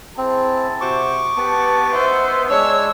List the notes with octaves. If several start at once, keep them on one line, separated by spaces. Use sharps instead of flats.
C4 E4 G#4 A5
C3 F#4 C5 C#6 D6
B3 G4 A5
D#4 C5 E5
G#3 D4 C#5 E6